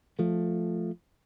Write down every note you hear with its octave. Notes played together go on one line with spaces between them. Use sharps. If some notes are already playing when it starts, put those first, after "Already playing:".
F3 A3